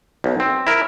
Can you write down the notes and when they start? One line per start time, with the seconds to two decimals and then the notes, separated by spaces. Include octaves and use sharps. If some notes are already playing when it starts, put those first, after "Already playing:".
0.24 B1
0.40 C4
0.67 E4 A#4